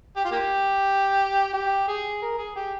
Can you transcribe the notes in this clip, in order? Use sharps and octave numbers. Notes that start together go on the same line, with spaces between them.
G4
F4
A#3 G4
G4
G#4
A#4
G#4
G4